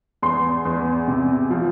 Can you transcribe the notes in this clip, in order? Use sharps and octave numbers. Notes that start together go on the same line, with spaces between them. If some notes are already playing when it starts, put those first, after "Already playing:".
E2 C6
E2
C3
F3